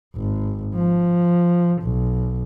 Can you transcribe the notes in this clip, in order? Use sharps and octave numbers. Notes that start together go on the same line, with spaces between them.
G#1
F3
B1